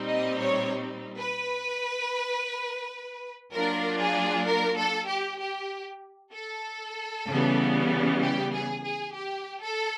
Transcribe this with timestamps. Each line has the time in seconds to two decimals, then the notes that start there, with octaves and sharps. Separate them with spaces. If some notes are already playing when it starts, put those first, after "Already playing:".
Already playing: A#2 G3 C4 D#4
0.09 D#5
0.40 C#5
1.18 B4
3.52 F#3 A#3 D4 F4 A#4
4.00 G#4
4.47 A#4
4.77 A4
5.09 G4
5.40 G4
6.34 A4
7.28 C#3 E3 G3 B3
8.22 G4
8.54 G#4
8.85 G#4
9.16 G4
9.63 A4